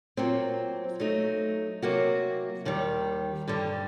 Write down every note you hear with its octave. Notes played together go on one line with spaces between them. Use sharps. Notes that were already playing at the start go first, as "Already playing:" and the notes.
A#2 F#3 C4
F#3 A3 D#4
C3 F#3 A#3 F#4
D#2 D#3 G3
G2 D3 G3